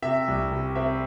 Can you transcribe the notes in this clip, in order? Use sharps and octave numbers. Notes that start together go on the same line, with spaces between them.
C3 E5
C2
C3
C4 E5